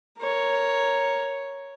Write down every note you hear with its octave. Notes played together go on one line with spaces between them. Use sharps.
A#4 C#5